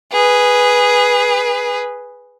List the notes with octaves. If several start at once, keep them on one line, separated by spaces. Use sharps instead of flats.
G#4 B4